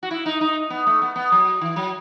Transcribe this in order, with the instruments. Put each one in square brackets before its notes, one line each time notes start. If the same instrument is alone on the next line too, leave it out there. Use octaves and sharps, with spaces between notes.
[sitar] F#4
E4
D#4
D#4
B3
A3
B3
B3
F#3
E3
F#3